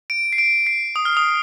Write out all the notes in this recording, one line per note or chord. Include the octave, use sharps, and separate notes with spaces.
D7
C7
D7
C7
D#6
F6
D#6